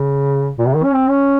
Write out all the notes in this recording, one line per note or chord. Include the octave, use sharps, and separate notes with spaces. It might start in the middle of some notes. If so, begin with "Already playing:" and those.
Already playing: C#3
A#2
C3
D#3
C#4
C4
C#4